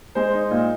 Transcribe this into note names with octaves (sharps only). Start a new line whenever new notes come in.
G#3 C5
D#4
A#2